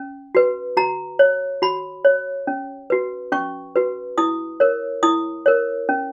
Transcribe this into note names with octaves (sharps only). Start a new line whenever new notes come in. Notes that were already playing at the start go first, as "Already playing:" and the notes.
Already playing: C#4
F#4 B4
F#4 A#5
C#5
F#4 B5
C#5
C#4
F#4 B4
C#4 C#6
F#4 B4
E4 D#6
A#4 C#5
E4 D#6
A#4 C#5
C#4